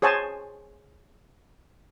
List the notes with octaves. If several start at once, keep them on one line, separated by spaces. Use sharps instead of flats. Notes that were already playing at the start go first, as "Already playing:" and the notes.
G#4 C5 C#5 G#5 A5